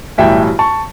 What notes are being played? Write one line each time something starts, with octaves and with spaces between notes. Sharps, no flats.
B1 A2 E3 G3 E5 G5
A5 C#6